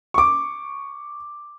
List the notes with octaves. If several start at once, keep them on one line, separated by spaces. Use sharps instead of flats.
C#6 D6